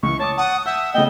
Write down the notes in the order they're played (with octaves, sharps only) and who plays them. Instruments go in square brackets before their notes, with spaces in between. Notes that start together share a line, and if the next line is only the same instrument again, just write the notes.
[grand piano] C#2 E3 [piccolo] C#6
[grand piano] C#5 D6 D#6 [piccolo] A5
[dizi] F#5 [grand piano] A5 C#6 [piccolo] D#6
[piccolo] E5 [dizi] F#5 [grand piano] G6
[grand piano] C#3 A3 B3 [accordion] D#5 G5 [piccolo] G7